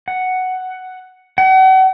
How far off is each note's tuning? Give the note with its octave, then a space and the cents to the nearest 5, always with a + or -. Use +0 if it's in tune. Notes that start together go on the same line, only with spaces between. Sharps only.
F#5 +5
F#5 +40